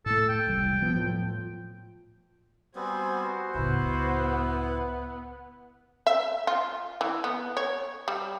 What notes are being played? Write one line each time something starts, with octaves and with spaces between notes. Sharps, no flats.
A2 A3 A4
G5
E1 C2 G3
F3 B3
A2 F3
G3 B3 C4 F#4 C5 G#5
C#2 A2 B3 E4
E5
F4
E3
B3
C#5
G3